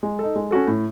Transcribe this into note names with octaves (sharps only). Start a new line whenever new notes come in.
G#3
D#4 A4
G#3
C#4 F#4 A4
A2